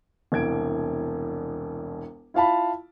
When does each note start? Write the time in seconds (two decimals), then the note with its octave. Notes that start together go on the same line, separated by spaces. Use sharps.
0.32 E1 C2 G#6 D7
2.34 E4 F4 F5 A5 B5